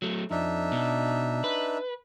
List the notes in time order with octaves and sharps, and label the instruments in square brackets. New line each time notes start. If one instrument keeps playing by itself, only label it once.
[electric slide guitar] F#3 A3
[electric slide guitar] F2 [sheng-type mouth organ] D4 D#4 E5
[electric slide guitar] B2
B4